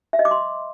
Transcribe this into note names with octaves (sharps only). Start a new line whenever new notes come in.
E5
D#5
D6
C6